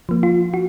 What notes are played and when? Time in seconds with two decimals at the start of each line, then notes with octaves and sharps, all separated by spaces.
0.09 F3 A#3
0.23 F4
0.54 F#4